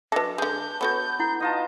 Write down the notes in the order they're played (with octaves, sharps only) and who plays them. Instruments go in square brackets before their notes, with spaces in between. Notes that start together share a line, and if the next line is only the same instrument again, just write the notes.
[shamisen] F#3 A4 [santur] D4 [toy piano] B4 D#5 E5
[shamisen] D3 G#3 [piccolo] G6
[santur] B3 [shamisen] F#4 A4 C#5
[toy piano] E4 F#5
[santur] D#4 F4 A5 [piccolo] D#5